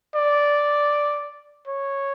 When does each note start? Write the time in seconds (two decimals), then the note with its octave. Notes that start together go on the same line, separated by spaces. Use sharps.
0.15 D5
1.67 C#5